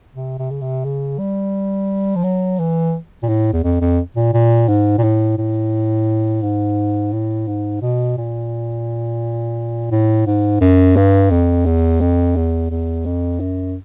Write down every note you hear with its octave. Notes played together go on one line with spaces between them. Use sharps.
C3
C3
C#3
C3
C#3
G3
F3
F#3
E3
A#2
A2
E2
F2
F2
A#2
A#2
G#2
A#2
A2
A2
G#2
A2
G#2
B2
A#2
A2
G#2
F#2
G2
F2
E2
F2
E2
E2
F2
F#2